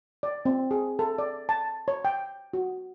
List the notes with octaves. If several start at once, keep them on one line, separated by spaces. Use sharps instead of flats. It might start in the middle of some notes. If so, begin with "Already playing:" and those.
D5
C4
G#4
A4
D5
A5
C#5
G5
F#4